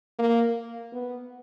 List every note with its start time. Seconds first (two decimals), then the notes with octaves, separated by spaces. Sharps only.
0.19 A#3
0.93 B3